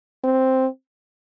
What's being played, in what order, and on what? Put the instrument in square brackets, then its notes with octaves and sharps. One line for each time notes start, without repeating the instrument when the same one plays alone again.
[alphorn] C4